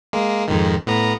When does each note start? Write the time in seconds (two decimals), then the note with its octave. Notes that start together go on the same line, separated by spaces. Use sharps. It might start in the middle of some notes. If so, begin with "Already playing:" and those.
0.13 G#3 A#3
0.48 F2 G#2 D#3
0.87 A2 B3 A#5